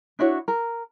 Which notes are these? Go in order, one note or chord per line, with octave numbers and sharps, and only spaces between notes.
D4 E4 F#4 C#5
A#4